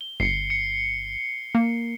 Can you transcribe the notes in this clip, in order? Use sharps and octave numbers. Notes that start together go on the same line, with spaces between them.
G7
G1 C7 C#7
C#7
A#3